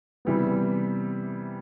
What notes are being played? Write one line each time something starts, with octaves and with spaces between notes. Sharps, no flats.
C3 E3 G3 B3